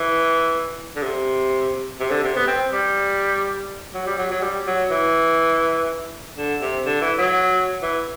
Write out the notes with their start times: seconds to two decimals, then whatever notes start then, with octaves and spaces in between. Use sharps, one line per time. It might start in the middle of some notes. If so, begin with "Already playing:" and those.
Already playing: E3
0.96 D3
1.03 C3
2.00 C3
2.11 D3
2.24 C3
2.36 B3
2.48 C4
2.73 G3
3.94 F#3
4.07 G3
4.18 F#3
4.31 F#3
4.42 G3
4.67 F#3
4.91 E3
6.37 D3
6.61 C3
6.86 D3
7.01 E3
7.18 F#3
7.83 E3